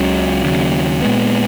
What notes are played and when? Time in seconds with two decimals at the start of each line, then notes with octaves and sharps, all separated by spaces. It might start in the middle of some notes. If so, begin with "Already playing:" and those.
Already playing: C#2 C#3 F#3
0.44 D#2 C#3 F#3
1.02 A#2 G#3 B3